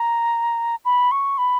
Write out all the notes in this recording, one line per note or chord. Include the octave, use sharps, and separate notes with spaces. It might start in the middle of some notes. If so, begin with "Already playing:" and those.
Already playing: A#5
B5
C#6
B5